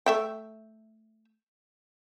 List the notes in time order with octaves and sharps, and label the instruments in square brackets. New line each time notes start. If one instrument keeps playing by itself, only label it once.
[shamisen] A3 E5 G5